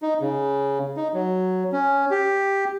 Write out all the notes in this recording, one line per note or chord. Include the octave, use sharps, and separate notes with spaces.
D#4
C#3
D#4
F#3
C#4
G4